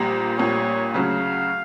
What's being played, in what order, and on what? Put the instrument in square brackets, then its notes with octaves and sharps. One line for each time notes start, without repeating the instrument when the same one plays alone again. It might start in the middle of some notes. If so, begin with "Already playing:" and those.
Already playing: [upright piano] A#1 A#2 G3
[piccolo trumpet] C5
[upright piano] A#1 A#2 G3 [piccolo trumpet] C#5
[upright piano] D2 C#3 F#3 [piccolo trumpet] F5